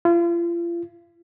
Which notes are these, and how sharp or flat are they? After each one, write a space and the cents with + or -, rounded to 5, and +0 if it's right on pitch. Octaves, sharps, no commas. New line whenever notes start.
F4 -40